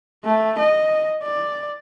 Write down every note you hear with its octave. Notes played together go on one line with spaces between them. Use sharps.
A3
D#5
D5